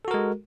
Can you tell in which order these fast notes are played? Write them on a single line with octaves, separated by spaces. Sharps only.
A4 F#4 A#4 G#3